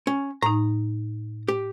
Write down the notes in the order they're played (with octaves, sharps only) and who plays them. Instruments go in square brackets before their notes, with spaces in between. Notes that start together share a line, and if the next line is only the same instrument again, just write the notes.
[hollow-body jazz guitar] C#4
[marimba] A2 D#4 [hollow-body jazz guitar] A#5
[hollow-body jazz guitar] G4